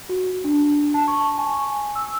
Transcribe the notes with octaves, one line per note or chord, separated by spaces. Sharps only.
F#4
D4
A5
C#6
G#5
E6